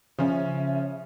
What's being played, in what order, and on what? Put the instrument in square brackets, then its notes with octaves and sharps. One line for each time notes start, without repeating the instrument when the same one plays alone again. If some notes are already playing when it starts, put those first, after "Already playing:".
[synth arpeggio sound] C#3 [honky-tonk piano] F3 C#4 [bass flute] E5